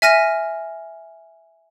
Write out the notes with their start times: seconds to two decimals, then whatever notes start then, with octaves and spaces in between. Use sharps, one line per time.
0.02 E5 G#5 F6 A#6 D#7